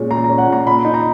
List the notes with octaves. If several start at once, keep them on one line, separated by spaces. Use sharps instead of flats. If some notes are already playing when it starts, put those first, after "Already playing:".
Already playing: A#2 G#3 C#4
A#2 A#5
A#5
C#4
F#5
A#2
A#5
A#2 B5
D#4
A#5